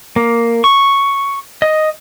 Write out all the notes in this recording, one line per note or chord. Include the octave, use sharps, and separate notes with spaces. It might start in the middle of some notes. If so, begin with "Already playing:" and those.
A#3
C#6
D#5